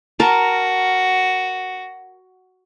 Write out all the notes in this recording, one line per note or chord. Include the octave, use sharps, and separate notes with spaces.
F#4 A#4 A5